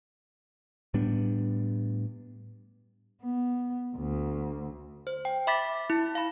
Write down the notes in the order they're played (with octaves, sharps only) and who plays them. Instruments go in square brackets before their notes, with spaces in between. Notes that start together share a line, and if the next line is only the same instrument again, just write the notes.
[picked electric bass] A2 G3 B3 D4
[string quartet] B3
D2
[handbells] C5
G5
E5 B5 D6 A6 B6
E4
F5 B5